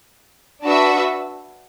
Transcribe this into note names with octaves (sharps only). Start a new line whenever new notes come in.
D4 F#4 B4 E5 A5